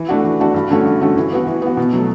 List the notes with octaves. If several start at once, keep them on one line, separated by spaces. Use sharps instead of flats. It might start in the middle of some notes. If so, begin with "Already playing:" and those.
Already playing: E3
A3 D4 F#4
E3
A3 D4 F#4
G2
D3 A3 C#4 F#4
G2
D3 A3 C#4 F#4
E3
B3 F#4
E3
B3 F#4
B2
F#3 A3